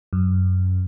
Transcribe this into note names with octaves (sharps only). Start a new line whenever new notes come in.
F#2